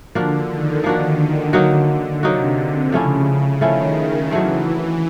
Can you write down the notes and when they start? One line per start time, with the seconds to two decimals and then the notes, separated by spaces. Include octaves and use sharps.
0.15 D3 F3 A#3 D4 F#4
0.49 D#3
0.84 D3 F3 A#3 D4 F#4
1.53 F#3 A#3 D#4 F#4
2.23 C3 F#3 A#3 D#4 F#4
2.92 C#3 F3 A3 C#4 E4
3.61 D#3 F3 A3 C#4 E4
4.31 E3 F#3 A3 C4